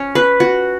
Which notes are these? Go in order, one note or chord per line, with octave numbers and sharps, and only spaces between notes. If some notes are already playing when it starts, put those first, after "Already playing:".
Already playing: C#4
B4
F#4